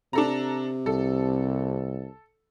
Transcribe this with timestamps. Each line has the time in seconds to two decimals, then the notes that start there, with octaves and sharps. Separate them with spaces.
0.13 C3 D4 A4 A#5
0.86 C2 A4